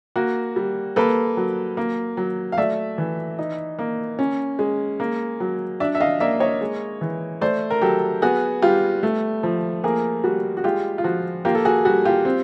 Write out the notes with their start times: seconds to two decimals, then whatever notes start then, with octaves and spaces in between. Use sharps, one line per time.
0.16 A#3 F#4
0.56 G3
0.96 A#3 A4 B4
1.37 F#3
1.77 A#3
2.17 F#3
2.52 F5
2.58 A3 D5 E5
2.98 E3
3.39 D#4
3.79 A#3
4.19 C#4
4.59 G#3
5.00 A#3
5.40 F#3
5.80 D4 D5 E5
5.95 E5
6.01 D#5 F5
6.20 A#3 D5 E5
6.40 C#5 D#5
6.61 G#3
7.01 E3
7.41 A3 C5 D5
7.70 A#4
7.81 F#3 G4 A4
8.22 B3 F#4 G#4
8.62 G3 F4 G4
9.03 A3
9.43 F3
9.84 A#3 G#4 A#4
10.24 G3 F#4
10.57 F#4
10.64 G#3 F4 G4
10.98 F4
11.04 F3 F#4
11.45 A#3 F4 G4
11.55 A4
11.65 F#4 G#4
11.85 G3 F#4
12.05 F4 G4
12.25 C4